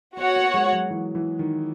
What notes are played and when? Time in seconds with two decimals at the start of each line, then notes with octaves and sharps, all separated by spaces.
0.17 B3 F#4 C#5 F#5
0.36 A#3
0.54 G#3
0.72 F#3
0.90 E3
1.15 E3
1.39 D#3